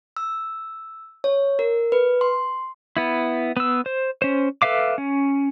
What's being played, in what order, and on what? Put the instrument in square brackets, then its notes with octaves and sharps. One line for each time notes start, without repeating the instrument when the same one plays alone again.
[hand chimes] E6
C#5
A#4
B4
C6
[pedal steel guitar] B3 E4
B3 E6
C5
C#4 C5
A4 B4 E5 F5 D6
C#4